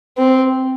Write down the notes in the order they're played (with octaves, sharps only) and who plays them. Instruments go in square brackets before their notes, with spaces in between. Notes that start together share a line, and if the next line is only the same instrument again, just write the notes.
[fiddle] C4